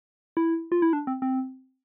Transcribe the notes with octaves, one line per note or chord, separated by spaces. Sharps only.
E4
F4
E4
D4
C4
C4